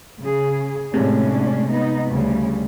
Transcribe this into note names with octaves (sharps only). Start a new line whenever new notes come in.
C#3 G#4
A2 C3 G#3 A3 C#4 D4
B3 D#4
D2 C#3 G3